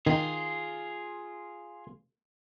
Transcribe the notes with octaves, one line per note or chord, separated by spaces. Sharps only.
D#3 F4 G#4